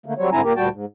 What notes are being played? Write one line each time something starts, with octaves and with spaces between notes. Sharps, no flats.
D3 A3 A#3
F#3 G3 C4 C#5
G#2 D3 C4 E4 G#5 A#5
A#2 A#3 G4 A#4
D2 A#2 G3 F#4 G5 A5
G#2